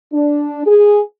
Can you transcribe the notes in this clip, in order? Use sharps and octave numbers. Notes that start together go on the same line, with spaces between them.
D4
G#4